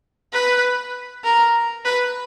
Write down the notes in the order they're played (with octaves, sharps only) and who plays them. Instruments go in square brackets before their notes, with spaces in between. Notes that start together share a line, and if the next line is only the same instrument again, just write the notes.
[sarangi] B4
A#4
B4